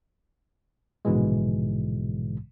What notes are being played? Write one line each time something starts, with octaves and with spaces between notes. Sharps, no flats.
A#1 G#2 B2 D3 E3 G#3